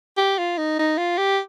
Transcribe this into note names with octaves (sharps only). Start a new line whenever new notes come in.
G4
F4
D#4
D#4
F4
G4